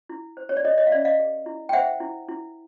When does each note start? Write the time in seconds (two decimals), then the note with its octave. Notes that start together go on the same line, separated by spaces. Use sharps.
0.09 E4
0.37 C5
0.49 C#5
0.57 D5
0.65 A4 C#5 D#5
0.78 C#5 D#5
0.87 F5
0.91 C#4 D5 E5
1.05 D#5 F5
1.19 G#4
1.46 E4
1.69 G5
1.73 C5 E5 F#5
2.00 E4
2.29 E4